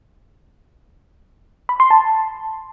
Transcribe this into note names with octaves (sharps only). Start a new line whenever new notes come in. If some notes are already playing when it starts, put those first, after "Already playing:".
B5
C6
A5